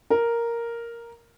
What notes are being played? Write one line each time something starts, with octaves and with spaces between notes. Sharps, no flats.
A#4